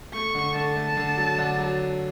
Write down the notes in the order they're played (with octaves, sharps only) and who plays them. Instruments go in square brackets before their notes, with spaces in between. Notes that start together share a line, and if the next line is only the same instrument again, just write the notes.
[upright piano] A3 [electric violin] C#6
[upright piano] D3
[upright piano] D3 [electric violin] A5
[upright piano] A3
D3
F#3
D3
F#3